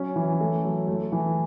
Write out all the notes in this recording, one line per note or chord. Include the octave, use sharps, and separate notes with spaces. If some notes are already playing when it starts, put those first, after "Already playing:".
Already playing: F#3 C#4
E3
A3
F#3
A3
E3